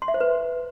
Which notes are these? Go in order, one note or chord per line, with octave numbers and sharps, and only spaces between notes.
C6
E5
C5
B4